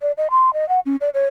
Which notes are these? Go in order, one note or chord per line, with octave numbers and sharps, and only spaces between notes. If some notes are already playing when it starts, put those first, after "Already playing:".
D5
D#5
C6
D#5
F#5
C#4
D5
C#5